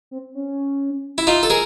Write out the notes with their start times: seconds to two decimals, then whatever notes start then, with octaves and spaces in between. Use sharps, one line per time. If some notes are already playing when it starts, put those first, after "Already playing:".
0.11 C4
0.35 C#4
1.18 E4
1.27 D#4 F4
1.43 A4
1.50 G#4 A#4